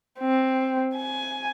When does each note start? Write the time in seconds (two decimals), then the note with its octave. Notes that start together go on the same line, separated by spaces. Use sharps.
0.19 C4
0.95 G#5